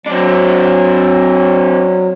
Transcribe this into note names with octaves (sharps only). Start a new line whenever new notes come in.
F#3 C4 D4